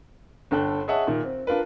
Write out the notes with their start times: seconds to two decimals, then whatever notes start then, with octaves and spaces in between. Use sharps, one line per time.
0.51 G1 D3 A4 G5 F#6
0.88 G#4 C#5 D#5 E5 F#5 A5
1.07 A#2 D#3
1.24 C4
1.47 D4 F4 A#4 B4